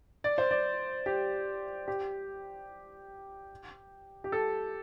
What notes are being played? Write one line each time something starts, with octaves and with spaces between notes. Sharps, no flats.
D5
C5
D5
G4
G4
G4
A4